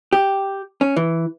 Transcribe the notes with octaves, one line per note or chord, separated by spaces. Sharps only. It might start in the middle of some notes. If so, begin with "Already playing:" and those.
G4
C#4
E3